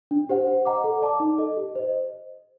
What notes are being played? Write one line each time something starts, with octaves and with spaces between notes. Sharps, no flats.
D4
G4 C5 F#5
C5
D#5 F#5 A#5 D6
A4
D5 A5 D6
D#4
A4 D#5
G4
C5 D#5